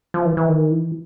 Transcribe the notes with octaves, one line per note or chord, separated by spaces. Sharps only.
F3
E3
E3
D#3
E3